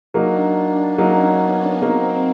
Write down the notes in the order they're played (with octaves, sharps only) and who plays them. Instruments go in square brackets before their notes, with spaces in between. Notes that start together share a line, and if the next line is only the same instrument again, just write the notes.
[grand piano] F#3 A#3 D#4 [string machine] D4
[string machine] D4
[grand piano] F#3 A#3 D#4 [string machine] C#4
[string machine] B3
[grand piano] F#3 A#3 D#4 [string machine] C4